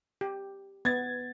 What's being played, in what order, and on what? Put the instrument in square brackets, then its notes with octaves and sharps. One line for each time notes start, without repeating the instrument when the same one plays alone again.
[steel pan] G4
[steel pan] B3 [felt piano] G#6 A6